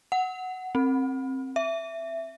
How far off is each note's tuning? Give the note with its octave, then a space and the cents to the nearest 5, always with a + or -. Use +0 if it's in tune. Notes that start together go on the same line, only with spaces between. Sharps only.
F#5 +5
C4 +20
E5 +10